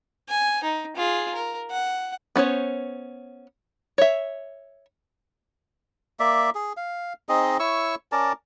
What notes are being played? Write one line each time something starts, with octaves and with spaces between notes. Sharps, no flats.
G#5
D#4
F4 G#4
A#4
F#5
B3 C#4 C5 C#5
C#5 E5
A#3 D5 E5
G#4
F5
C4 D#4 G#4 D#5
E4 C#5 C#6 E6
C#4 A#4 D5 A5